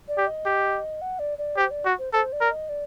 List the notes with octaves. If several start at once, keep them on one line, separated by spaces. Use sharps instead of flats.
D5
G4
D#5
G4
F#5
D5
D5
G4 C5
D5
F#4
C5
A4 C5
D5
A#4
D#5
D5